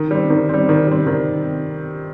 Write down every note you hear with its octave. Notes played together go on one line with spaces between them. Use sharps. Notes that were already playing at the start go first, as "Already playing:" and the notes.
Already playing: D#3
G3 C4
D#3
G3 C4
D#3
G3 C4
D#3